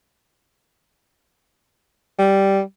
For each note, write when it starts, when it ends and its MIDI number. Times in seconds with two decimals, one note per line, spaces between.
2.19 2.61 55